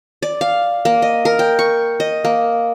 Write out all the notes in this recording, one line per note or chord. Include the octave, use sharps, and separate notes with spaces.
D5
F5
A#3
D#5
A#4
G5
C#6
D#5
A#3